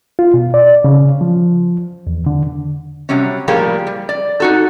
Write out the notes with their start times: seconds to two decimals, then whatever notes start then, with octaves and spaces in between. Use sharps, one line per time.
0.19 F4
0.34 B2
0.54 D5
0.84 C#3
1.21 F3
2.07 E2
2.26 D3
3.09 C3 F#3 G3 C#4
3.48 A2 F3 G3 A#3 G#4 A#4
3.87 G3
4.09 D5
4.40 D#4 F#4 A4